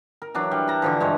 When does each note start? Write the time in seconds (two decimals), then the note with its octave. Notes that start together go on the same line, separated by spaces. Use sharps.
0.22 A#4
0.34 E3 F#3 D4
0.51 G3
0.68 A5 A#5
0.82 D3 E3 F3
1.00 G2 G#3 C#5 D5